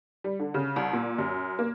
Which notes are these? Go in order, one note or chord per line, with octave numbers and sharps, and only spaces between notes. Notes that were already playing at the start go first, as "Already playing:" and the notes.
G3
D3
C#3
C2
A#2
F#2
A#3